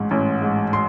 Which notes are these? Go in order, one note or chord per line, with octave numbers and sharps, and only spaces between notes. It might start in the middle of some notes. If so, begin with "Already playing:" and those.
Already playing: A1 G#2
A1
G#2
C6